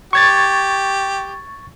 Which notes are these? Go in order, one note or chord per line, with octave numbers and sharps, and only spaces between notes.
G4 C#6 G#6 A6